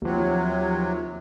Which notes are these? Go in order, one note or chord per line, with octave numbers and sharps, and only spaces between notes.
D#2 C3 F3 F#3